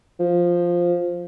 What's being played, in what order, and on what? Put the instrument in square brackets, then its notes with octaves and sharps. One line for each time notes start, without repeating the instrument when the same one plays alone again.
[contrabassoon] F3